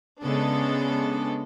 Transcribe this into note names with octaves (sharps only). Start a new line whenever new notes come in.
C#3 G#3 B3 D4 A4